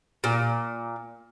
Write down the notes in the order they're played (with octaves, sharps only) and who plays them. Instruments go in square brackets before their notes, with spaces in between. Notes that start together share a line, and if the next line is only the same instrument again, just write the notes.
[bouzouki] A#2